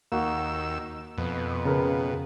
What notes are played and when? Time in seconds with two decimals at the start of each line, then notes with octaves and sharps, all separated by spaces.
0.12 D#2 A#3 F#4 E6
1.18 F2 B2
1.65 C#3 A#4 B4